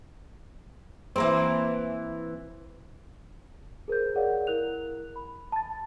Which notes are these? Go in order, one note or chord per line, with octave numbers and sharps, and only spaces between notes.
E3 A#3 C4
G#4 A#4 C5 G6
G#4 A#4 C#5 D5 F5 F#5
E4 A#4 F#6 F7
B5
A5 A6